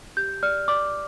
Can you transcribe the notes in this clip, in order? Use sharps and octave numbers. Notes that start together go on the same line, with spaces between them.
G4 G6
D5 F6
D5 D6